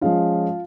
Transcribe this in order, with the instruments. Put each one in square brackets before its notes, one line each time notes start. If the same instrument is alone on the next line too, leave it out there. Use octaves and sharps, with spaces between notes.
[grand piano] F3 G#3 C#4 F4 F5